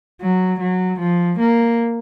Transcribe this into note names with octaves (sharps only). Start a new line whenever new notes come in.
F#3
F#3
F3
A#3